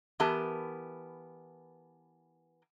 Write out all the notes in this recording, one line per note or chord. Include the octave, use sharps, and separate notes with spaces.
E3 B3 G4 A#4 A5